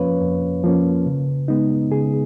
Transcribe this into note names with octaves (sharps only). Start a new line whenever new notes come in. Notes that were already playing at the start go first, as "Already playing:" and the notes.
Already playing: F2 F3 A#3 C#4 B4 C#5 F5
F2
F3 A#3 C#4
C#3
G#3 B3 D#4
C#3 G#4